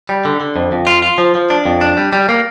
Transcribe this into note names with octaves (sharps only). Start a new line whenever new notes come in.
G3
D3
D3
F2
F2
F4
F4
F3
F3
D4
F2
D4
G3
G3
A#3